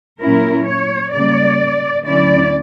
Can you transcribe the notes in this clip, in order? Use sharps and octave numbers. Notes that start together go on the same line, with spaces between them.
A#2 F#3 C#4 E4 A#4
C#5
C#3 G3 A#3 D5
D2 D3 F#3 C#4 E4 D5